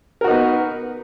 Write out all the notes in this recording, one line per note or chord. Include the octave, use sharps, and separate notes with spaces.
B3 D#4 F#4 A#4